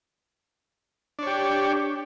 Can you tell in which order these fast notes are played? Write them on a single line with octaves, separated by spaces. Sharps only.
D4 C#5 G4